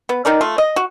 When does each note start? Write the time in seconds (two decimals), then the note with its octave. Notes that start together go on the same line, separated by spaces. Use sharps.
0.09 B3
0.25 D#3 D#4 A#4 D5
0.41 A3 F4
0.58 D#5
0.76 F#4